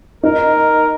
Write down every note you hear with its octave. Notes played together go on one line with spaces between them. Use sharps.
D#4 A#4